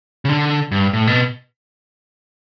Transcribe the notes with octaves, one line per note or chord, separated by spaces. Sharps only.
C#3
D3
G2
A2
B2